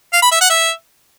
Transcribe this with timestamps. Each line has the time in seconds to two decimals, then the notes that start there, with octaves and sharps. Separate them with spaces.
0.13 F5
0.22 B5
0.31 E5
0.41 F#5
0.50 E5